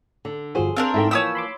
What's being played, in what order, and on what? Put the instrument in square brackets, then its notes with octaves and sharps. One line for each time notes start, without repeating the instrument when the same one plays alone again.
[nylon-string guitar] D3
[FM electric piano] G1 F3 F#4 [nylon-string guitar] G#4 C5
[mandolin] C4 D4 A#4 [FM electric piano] F5 F6 F#6
[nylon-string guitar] G#2 E5 G5 [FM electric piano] A3 E4
[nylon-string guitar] E3 F3 A#3 [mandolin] C#5 D#6 E6 [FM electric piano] G5 B5
[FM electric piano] B5 C6 D6